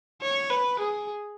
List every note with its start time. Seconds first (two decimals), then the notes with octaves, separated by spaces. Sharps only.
0.22 C#5
0.50 B4
0.79 G#4